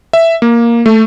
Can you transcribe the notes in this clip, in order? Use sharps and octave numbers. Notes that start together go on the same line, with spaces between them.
E5
A#3
A3